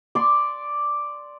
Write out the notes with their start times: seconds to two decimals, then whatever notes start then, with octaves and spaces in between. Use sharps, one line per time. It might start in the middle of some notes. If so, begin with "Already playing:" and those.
0.15 D5 C6 C#6